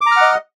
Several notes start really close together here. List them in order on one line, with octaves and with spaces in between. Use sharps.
D6 A#5 F6 F#5 D#5